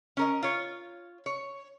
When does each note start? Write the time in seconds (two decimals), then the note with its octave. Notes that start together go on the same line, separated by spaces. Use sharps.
0.17 C#4 A#4 D#5
0.43 F4 C#5
1.26 C#5